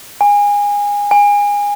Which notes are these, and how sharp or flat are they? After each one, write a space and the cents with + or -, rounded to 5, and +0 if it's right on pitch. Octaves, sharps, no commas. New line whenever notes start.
G#5 -25
G#5 -25